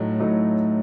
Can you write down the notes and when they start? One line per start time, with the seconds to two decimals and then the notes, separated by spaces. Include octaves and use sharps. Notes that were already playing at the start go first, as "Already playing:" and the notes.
Already playing: A2 F#3 A3 D#4
0.20 A2 F#3 A3 D#4